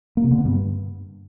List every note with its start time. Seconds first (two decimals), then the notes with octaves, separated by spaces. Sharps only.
0.17 A#3
0.24 C3
0.31 D3
0.38 B3
0.45 G2